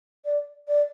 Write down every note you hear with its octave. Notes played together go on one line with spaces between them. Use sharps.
D5
D5